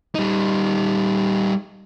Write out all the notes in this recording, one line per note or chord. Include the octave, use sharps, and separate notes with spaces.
G3 D#4